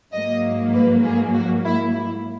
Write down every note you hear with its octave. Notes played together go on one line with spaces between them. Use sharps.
G#2 F#3 A#3 D#5
B4
G#4
F#4
E4
E4